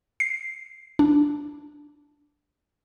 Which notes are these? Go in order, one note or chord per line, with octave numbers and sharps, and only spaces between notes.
C7
D4